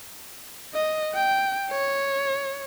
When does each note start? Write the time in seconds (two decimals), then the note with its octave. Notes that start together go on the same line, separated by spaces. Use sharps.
0.74 D#5
1.15 G5
1.71 C#5